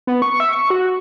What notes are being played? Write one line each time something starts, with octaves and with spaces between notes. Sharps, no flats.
B3
C#6
E5
C#6
F#4